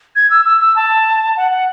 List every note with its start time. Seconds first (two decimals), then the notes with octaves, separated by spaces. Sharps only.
0.16 G#6
0.30 E6
0.45 E6
0.61 E6
0.76 A5
1.37 F#5
1.51 F#5